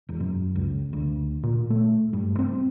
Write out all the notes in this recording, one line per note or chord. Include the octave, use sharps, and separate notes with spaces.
E1
F#2
C#2
D2
A#2
A3
G2
C4